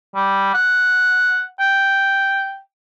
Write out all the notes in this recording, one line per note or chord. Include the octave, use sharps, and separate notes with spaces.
G3
F#5
G5